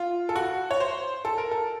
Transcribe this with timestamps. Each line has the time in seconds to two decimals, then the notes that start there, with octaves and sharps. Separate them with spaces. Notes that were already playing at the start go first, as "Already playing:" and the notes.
Already playing: F4
0.29 A4
0.36 F#4
0.71 C#5
0.80 C5
1.25 A4
1.38 A#4
1.51 A4